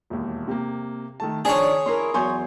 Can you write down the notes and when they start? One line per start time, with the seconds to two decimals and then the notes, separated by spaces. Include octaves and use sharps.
0.10 E1 D#2
0.48 C3 A#3
1.20 D#3 A3 A5
1.45 D#3 F3 D4 G#4 C5 C#5 A5 D#6
1.86 C#4 E4 A#4 C6 C7
2.14 E2 F#3 G#5 C6 C#6 G6